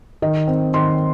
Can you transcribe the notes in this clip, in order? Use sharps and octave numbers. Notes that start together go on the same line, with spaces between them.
D#3 D#5
C4
D#3 C6